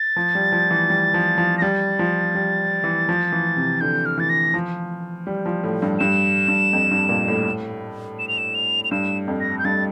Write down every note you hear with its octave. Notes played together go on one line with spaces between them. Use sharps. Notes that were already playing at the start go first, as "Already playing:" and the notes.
Already playing: A6
F3
G3
F3
E3
G3
F3
F3
A#6
G3 A6
F3
G3
E3
F3
E3
C3
D3 G6
F6
E3 A6
A#6
F3
G3
F3
A2
G2
G2 E7
G2
F2
G2
A#2
A2
E7
F7
E7
F7
F7
G2 E7
F2
A#6
G6
G2 A6